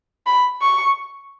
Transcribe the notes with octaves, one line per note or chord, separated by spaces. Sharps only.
B5
C#6